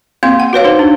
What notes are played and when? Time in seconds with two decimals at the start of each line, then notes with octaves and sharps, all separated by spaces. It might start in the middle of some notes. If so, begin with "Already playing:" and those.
0.23 A#3 C4 F5 C6
0.40 F#5
0.53 F#4 B4 C#5 F5
0.64 D#4 C5
0.79 D4